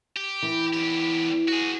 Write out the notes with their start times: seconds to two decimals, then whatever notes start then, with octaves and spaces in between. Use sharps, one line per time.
0.16 G4
0.43 E3
0.73 E2 G4
1.48 F#4 G#4